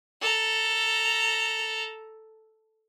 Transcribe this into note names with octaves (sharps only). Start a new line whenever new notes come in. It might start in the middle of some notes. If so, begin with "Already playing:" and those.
A4 A#5